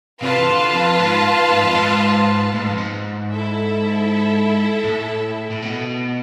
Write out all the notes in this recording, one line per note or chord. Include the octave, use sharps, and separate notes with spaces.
C3 F4 B4 F5 A5
E3
D3
F2
G#2
G#2
F2
G#2
A2
G#2
F2
G#2
E4 A4 E5
A2
A2
B2